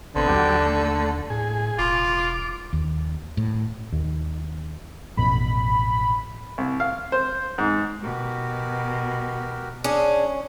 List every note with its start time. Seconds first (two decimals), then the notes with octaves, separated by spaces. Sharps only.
0.16 A1 B2 D3 C4
0.28 D#2 F#3 G4 D5
0.65 A3
1.30 A2 G#4
1.78 E1 F4 D6
2.73 D#2
3.37 A2
3.92 D#2
5.17 A1 F2 B2 B5
6.58 C2
6.80 F5
7.12 C5
7.58 G#2
8.03 B2 F#4 G4 A#4
9.84 C#4 D4 G#4 C#5